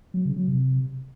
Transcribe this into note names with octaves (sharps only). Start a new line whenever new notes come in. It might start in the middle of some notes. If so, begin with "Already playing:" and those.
F#3
C#3
F#3
C3